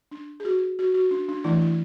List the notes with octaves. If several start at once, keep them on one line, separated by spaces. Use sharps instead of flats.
D4
G#4
F#4
F#4
F#4
D4
D4
E3 A3 D4 E4
E4